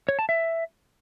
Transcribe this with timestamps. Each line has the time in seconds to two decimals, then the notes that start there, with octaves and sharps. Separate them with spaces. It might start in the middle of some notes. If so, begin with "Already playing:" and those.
0.09 C#5
0.19 A5
0.29 E5